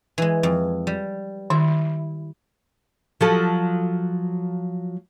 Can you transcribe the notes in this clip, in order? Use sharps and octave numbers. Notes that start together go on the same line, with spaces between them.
E3 G#3
F2
G3
D#3 E4
F3 F#3 A4